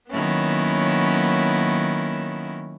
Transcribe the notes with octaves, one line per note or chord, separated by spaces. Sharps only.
D#3 F#3 A#3 B3 C#4 E4